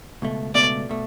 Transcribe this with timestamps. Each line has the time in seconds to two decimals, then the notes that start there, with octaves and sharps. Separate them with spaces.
0.22 C#2 B2 A3
0.54 C#2 B2 A3 D5
0.89 B2 A3